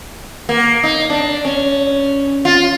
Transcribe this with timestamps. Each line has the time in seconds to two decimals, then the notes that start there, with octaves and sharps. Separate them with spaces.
0.49 A#3
0.83 D#4
1.10 D4
1.45 C#4
2.45 F4